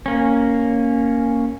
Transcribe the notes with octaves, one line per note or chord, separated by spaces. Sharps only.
A#3 C#4